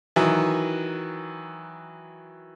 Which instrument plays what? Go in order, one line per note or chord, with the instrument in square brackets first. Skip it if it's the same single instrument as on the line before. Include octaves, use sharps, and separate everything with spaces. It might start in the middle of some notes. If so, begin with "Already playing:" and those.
[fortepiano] D#3 E3 F#3